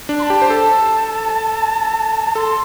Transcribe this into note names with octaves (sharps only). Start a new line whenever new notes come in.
D4
C6
A5
G4
C5
A4 A5
A4 C6